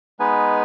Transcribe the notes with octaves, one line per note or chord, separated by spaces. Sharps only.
G#3 B3 D#4 B4 G#5